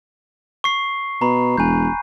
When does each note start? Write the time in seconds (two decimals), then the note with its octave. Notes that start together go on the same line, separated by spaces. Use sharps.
0.64 C#6 C7
1.21 B2 A#5 B5
1.58 E1 G#5 F#6 G6